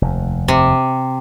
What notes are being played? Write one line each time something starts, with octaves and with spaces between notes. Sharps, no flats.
F1 D#2
C3